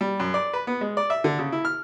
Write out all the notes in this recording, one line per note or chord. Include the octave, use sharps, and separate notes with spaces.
G3
F#2
D5
B4
B3
G#3
D5
E5
D3
C#3
E4
F6